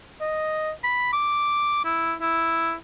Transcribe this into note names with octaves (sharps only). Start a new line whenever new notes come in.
D#5
B5
D6
E4
E4